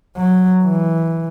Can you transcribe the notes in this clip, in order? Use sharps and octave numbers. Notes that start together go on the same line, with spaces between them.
F#3
E3